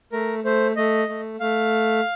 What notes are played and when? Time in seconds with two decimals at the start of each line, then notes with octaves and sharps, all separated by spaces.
0.12 A3 A#4
0.44 A3 C5
0.76 A3 D#5
1.09 A3
1.40 A3 F5